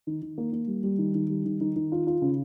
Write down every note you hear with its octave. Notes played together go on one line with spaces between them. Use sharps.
D#3
D#3
A#3
A#3
G3
G3
D#3
D#3
G3
D#3
D#3
D#3
F4
F4
C#3